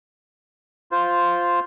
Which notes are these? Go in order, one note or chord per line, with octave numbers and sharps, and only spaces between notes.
F4 C5